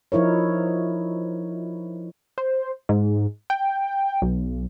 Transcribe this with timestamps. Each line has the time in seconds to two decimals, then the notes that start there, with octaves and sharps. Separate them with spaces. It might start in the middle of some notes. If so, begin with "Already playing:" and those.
0.12 F3 D#4 E4 A#4 C#5
2.38 C5
2.89 G#2
3.50 G5
4.22 B1